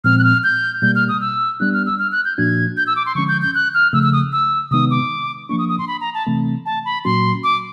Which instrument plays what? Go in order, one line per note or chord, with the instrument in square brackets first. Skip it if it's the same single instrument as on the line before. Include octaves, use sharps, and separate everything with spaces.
[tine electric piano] A#2 F3 G#3 C4 [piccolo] F6
[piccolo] F#6
F6
G6
[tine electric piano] B2 G3 A#3 [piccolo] G6
[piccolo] F6
D#6
E6
[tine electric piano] G3 B3 D4 [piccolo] F#6
[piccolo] F6
E6
F6
F#6
G6
[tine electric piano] A#2 F3 A#3 D4 F#4 [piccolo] G#6
[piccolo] G6
E6
D6
C6
[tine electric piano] D3 F3 G#3 C#4 [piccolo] C#6
[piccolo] G6
G6
F#6
F6
[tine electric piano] C#3 F3 A3 [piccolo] E6
[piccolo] E6
D#6
E6
[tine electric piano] C3 D#3 G#3 B3 D#4 [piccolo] D#6
[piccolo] D6
[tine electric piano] F3 A#3 D4 [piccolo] C#6
[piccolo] D#6
D#6
C6
B5
A#5
A5
[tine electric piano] C3 E3 A3 C4
[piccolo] A5
B5
[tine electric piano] A#2 F#3 A#3 C#4 F#4 [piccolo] C6
[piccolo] D6